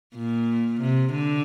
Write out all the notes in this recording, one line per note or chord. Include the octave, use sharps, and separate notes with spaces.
A#2
C3
D3